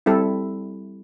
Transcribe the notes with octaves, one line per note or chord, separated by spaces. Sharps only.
G3 C4 E4 A4